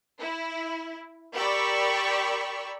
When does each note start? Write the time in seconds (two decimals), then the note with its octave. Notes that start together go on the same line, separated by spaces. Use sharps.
0.20 E4
1.36 G4 A#4 D5 B5 C#6 E6